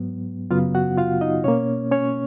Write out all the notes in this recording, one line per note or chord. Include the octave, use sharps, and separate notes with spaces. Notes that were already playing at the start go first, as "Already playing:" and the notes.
Already playing: G#2 F#3 B3
F#2 C#3 F#3 B3 F4 F5
F#4 F#5
F4 F5
D#4 D#5
B2 A#3 C#4 C#5
C#4 C#5